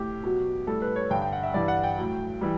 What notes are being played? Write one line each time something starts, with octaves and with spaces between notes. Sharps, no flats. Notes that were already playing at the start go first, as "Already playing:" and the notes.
Already playing: A2 G4
B2 F#3
A2 G3 A4
B4
C#5
G2 D3 G3 G5
G5
F#5
E5
G2 E3 G3 D5
F#5
G5
A2 F#3
E3 G3